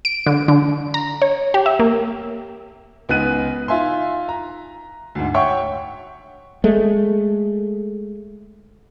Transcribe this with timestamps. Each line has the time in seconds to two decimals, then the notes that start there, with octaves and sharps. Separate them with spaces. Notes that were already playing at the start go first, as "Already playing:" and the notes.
0.05 D7
0.27 D3
0.48 D3
0.94 A#5
1.22 C#5
1.54 G4
1.66 E5
1.80 A#3
3.09 C#2 B3 D#4 F#6 D#7
3.68 D#4 F4 E5 G#5 C6
4.29 A#5
5.15 D2 G#2
5.34 C#5 E5 F#5 G5 C#6
6.64 G#3 A3